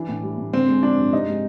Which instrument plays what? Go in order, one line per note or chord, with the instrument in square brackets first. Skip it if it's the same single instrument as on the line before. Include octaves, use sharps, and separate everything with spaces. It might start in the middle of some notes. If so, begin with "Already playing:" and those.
Already playing: [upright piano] E3 [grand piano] D4
[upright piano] A2
G3
A2
[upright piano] D3 [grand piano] C4
[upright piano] G#3
[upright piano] F3 [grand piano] D4
[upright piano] G2
[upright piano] C3 [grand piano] D#4
[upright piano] G#3